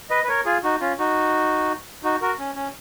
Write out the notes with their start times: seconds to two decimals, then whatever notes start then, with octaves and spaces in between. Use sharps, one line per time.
0.10 B4 D#5
0.24 B4
0.29 A#4 C#5
0.45 F4 G#4
0.63 D#4 F#4
0.80 C#4 F4
0.99 D#4 F#4
2.04 D#4 F#4
2.21 F#4 A#4
2.39 C#4
2.56 C#4